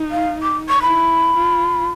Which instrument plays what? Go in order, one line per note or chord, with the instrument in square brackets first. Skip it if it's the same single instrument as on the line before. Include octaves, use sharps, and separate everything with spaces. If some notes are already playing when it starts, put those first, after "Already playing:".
Already playing: [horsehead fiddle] D#4
[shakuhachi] F5
D6
C#6
[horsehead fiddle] E4 [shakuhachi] B5
[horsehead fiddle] F4